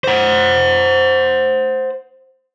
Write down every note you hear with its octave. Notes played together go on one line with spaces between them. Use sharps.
C5 F#5